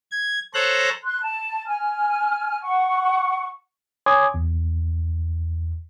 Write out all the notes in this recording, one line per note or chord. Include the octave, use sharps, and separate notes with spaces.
G#6
A4 C5 C#5 A#5 F#6
C6 F#6
A5
G#5 F6
F#5 C#6
C#5 G#5 C6 D6 D#6 G#6
E2